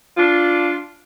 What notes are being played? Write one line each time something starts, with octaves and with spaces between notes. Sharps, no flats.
D4 F4